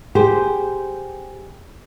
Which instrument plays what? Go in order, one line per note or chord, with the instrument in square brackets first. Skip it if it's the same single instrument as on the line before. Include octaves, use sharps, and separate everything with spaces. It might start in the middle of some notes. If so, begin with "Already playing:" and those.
[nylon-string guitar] G4 G#4 C5